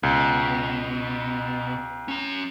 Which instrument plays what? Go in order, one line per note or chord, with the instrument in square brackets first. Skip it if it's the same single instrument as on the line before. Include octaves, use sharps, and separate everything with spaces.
[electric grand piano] C#2 [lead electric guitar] B2
[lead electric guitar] C#4 A#5